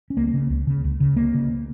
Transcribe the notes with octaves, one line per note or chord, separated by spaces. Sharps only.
C#4
C#2 A#3
A#3
C#3
C#2
C#3
C#2
C#3
C#2 A#3
C#3